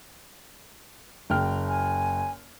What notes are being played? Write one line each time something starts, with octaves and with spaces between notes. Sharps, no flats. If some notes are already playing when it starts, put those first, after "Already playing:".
F#1 G5 F6
G#5